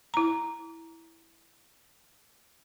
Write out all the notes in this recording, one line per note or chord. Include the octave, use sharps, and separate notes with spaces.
E4 A#5